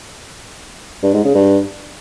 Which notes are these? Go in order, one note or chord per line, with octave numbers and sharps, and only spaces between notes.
G2
G#2
C#3
G2